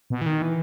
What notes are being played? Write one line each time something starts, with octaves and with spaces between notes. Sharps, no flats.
B2
E3
D#3
E3